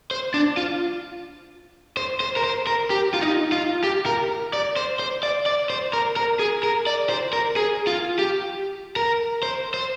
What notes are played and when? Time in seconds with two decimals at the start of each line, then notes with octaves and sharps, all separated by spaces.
0.11 C5
0.34 D4
0.57 F4
1.97 C5
2.20 C5
2.36 A#4
2.44 C5
2.67 A#4
2.90 G4
3.14 F4
3.21 D#4
3.52 F4
3.84 G4
4.06 A#4
4.53 D5
4.76 C5
4.99 C5
5.23 D5
5.46 D5
5.70 C5
5.93 A#4
6.16 A#4
6.39 G#4
6.63 A#4
6.87 D5
7.10 C5
7.33 A#4
7.56 G#4
7.87 F4
8.19 G4
8.96 A#4
9.43 C5
9.74 C5